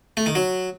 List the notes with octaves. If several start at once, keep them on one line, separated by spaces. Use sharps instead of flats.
A3
D#3
F#3